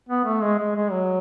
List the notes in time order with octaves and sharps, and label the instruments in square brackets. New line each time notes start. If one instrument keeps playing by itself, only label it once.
[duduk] B3
A3
G#3
G#3
G#3
F#3